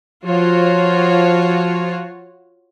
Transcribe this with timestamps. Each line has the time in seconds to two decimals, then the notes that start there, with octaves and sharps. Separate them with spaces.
0.25 F3 F4 F#4 C#5